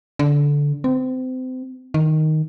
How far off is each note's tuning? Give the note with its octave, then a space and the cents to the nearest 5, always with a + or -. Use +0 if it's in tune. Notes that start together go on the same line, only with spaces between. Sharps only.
D3 -15
C4 -30
D#3 +0